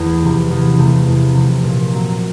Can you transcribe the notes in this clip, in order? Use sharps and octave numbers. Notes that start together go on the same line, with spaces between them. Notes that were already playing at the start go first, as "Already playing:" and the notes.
Already playing: E2 A3
C3 F3 A3
E2
C3 F3 A3
E2
C3 F3 A3
A#2
F#3 A#3